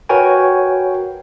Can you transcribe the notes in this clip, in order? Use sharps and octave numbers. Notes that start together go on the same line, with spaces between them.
F#4 A#4 B4 C#5 G5 G#5